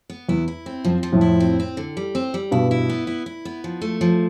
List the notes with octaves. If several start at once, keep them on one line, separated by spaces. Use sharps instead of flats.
B3
E2 E4
E4
C4
F2 F3
F3
F2 A2
E4
C4
C4
D3
G3
C4
G3
G2 B2 E4
E4
B3
E4
E4
B3
F3
A3
F3